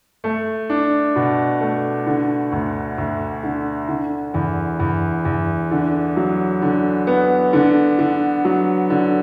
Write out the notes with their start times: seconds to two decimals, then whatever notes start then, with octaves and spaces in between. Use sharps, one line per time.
0.24 A3
0.70 D4
1.16 B2
1.61 A3
2.06 D3
2.52 D2
2.98 D2
3.43 D3
3.88 D3
4.34 E2
4.80 E2
5.25 E2
5.71 D3
6.17 F#3
6.62 D3
7.07 B3
7.53 D3
7.99 D3
8.45 F#3
8.90 D3